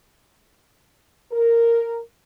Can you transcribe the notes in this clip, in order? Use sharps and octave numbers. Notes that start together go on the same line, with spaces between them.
A#4